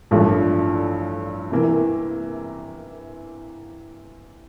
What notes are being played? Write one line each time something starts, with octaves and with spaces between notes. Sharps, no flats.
A1 G2 F3 A3 D4
C3 E3 A#3